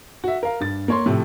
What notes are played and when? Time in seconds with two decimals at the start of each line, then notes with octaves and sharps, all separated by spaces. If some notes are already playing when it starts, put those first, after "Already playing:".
0.24 F#4 E5
0.43 A#4 F5
0.60 G2 A6
0.88 A#3 C#5 C6
1.06 A2 C3 F3 A3